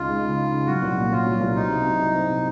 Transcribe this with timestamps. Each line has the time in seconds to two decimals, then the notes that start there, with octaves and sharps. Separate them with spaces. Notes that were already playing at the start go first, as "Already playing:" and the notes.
Already playing: C#2 C#3 D#4 F4
0.09 G#3
0.24 C#3
0.38 D#4
0.52 C#3
0.67 F#3 F#4
0.82 C2
0.97 A#2
1.12 C#4 F4
1.26 F#3
1.41 C2
1.56 C4 D#4
1.71 C3
1.85 F#3
2.00 F#4
2.15 C4
2.30 C3